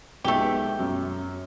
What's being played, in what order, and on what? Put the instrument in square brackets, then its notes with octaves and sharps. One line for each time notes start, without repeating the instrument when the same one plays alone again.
[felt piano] B1 G#3 B3 [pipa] A3 G4
[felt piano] F#2